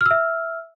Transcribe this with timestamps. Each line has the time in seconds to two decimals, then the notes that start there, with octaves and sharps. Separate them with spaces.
0.01 F6
0.06 E6
0.11 E5